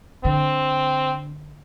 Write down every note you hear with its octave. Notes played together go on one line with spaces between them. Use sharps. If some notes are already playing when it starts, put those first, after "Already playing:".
D3 C4